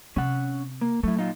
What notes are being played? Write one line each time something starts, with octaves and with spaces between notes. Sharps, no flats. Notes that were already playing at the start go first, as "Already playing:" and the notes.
C3 C#4 F#5
A#3
F#3 A3 E4
A#2 D#4 F4